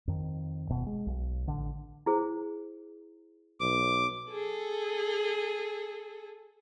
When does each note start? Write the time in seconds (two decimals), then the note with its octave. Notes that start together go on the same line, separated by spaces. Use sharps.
0.07 F2 D#3
0.69 D#1 B2
0.87 G#3
1.06 B1
1.46 A1 D3
2.06 E4 G#4 C5
3.60 B1 D6
4.31 G#4 A4